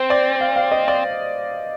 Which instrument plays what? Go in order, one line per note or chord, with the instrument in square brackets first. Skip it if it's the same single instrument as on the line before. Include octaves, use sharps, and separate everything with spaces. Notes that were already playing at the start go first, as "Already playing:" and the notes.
Already playing: [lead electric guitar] C4 [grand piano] C5
[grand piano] D5
F5
F5
D#5
D5